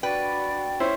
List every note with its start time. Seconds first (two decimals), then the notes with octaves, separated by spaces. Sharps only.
0.03 D4 F#4 B4 D5 G5
0.80 C#4 E4 C5